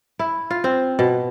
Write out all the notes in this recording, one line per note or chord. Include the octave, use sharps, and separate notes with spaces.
E4
F4
C4
B2